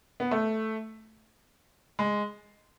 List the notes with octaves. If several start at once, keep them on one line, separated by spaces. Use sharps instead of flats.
B3
A3
G#3